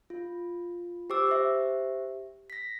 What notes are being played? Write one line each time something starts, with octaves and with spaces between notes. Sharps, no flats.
F4
G4 C5 D6 E6
G4 C5 E5
A#6 B6